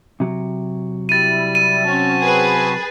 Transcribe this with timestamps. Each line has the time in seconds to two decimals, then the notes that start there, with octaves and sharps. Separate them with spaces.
0.20 C3 F#3
1.09 G3 E4 A6 D#7
1.55 D#7
1.85 C4 C#4 F#4 A5
2.20 G#4 B4